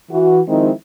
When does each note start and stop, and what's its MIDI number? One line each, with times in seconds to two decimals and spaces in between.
0.11 0.40 52
0.11 0.40 66
0.48 0.70 51
0.48 0.70 53
0.48 0.70 56
0.48 0.70 60
0.48 0.70 63
0.48 0.70 64